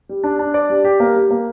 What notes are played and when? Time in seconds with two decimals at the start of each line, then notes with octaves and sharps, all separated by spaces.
0.09 G3
0.24 D4
0.39 D4
0.54 D5
0.70 G3
0.84 G4
1.00 A#3
1.15 G3
1.31 A#3